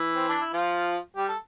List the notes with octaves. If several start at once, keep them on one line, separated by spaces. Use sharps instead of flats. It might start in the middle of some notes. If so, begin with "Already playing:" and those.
Already playing: E3 E4
C4
D4
E4
F3 F4
G3 G4
A4